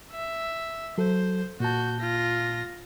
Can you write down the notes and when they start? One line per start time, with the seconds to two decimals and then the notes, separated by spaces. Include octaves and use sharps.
0.12 E5
0.98 F#3 A4 C5
1.60 A#2 F#4 A5 G6
2.00 F4 A#6